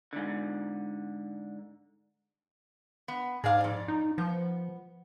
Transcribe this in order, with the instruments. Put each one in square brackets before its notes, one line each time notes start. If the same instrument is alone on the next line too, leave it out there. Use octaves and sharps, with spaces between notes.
[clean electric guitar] G#2 D3
[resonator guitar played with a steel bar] B3
[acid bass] G#2 [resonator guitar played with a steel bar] G#4 D5 F5
[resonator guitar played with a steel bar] F2 D5
[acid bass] D#4
[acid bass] F3 [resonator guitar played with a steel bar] B3